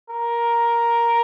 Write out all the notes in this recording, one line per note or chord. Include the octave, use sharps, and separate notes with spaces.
A#4